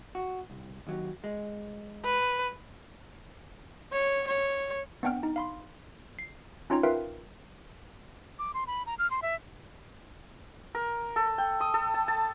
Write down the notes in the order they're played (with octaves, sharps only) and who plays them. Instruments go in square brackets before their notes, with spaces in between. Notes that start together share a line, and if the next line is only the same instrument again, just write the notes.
[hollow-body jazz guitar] F#4
C2
D#2 F#3
G#3
[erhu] B4
[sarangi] C#5
C#5
[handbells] B3 C4 D4 F#5 G5 F6
D#4
F5 B5 C6
C7
C#4 D#4 F4 C#5 G5 A#5
F4 A#4 B4 E5 F5 G5
[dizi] D6
C6
B5
A#5
F6
C6
E5
[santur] A#4
A4
G5
D#6
A4
A5
A5